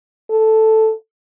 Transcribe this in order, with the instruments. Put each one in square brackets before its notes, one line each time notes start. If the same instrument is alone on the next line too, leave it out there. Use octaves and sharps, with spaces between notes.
[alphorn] A4